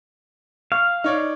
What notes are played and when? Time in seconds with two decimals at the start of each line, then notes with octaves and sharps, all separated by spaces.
0.72 F5 C#6
1.04 D#4 C#5 D5